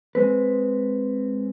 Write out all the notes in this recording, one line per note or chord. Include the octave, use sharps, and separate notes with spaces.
G#3 C4 B4